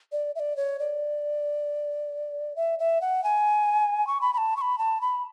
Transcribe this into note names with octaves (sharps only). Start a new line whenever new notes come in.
D5
E5
D5
C#5
D5
E5
E5
F#5
G#5
C#6
B5
B5
A5
C#6
B5
A5
B5